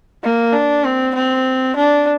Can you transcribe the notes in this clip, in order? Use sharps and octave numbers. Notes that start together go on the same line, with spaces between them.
A#3
D4
C4
C4
D4